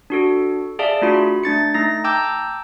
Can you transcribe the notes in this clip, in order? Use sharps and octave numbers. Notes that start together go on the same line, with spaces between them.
D4 F#4 A4
G#4 D5 E5 F5 A5
A3 D4 F4 F#4 B5
A3 D4 A6 C#7
A3 D#4 A#6
G5 A5 A#5 D6 E6 G6